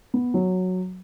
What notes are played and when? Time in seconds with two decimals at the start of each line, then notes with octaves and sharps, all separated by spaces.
0.14 B3
0.34 F#3